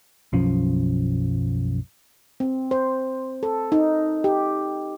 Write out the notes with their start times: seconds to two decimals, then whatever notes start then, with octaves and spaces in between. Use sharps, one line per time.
0.33 B1 F#2 F3 C#4
2.40 C4
2.71 C5
3.43 A4
3.72 D#4
4.24 G4